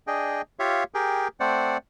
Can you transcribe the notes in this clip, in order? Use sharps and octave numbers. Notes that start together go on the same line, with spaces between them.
D4 G#4 D#5 G5
F4 G4 C#5 E5 F5
G4 G#4 A#4 G5
A3 C4 C5 D5 F#5